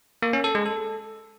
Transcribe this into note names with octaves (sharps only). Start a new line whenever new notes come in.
A#3
C#4
A4
G#3
A4